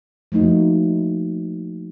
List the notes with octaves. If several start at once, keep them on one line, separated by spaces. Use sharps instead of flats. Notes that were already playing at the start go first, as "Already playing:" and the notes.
F3 A3 A#3 D#4 F#4